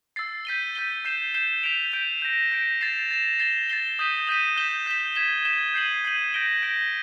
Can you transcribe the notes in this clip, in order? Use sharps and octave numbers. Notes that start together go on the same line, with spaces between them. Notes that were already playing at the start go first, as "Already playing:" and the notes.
E6 A6 C7
G6 B6 D#7 G7
G6 B6 D#7 G7
G6 C7 E7 G7
G6 C7 E7 G7
G6 B6 D7 F7
G6 B6 D7 F7
G6 A#6 D7
G6 A#6 D7
A6 C7 E7
A6 C7 E7
A6 C7 E7 G7
A6 C7 E7 G7
D#6 G6 B6 D#7
D#6 G6 B6 D#7
G6 B6 E7 G7
G6 B6 E7 G7
G#6 B6 E7 G7
G#6 B6 E7 G7
G6 C7 D#7 F#7
G6 C7 D#7 F#7
G6 A#6 D7 G7
G6 A#6 D7 G7